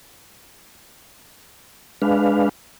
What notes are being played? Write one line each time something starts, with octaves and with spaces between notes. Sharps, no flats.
G#3 D4 B4 F5